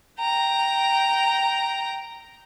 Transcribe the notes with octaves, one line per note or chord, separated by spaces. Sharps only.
G5 A#5